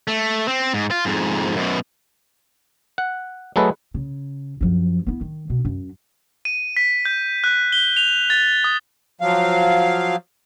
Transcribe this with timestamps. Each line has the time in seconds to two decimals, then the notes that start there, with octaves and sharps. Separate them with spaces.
0.08 A3
0.48 C4
0.74 G#2
0.91 F4
1.05 F2 G#2
1.56 F#2 B2
2.98 F#5
3.56 F#3 A3 G#4 A4 B4 D#5
3.94 C#3
4.61 F#2 F3
5.06 B3 E4
5.21 D#3
5.50 B2
5.65 F#2
6.45 D#7
6.77 B6
7.05 G6
7.44 F#6
7.72 G7
7.97 F7
8.30 A6
8.64 D#6
9.21 F3 F#3 F5